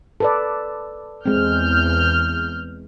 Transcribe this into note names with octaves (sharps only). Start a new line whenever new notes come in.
A4 B4 D5
E2 G#3 C4 F6 G6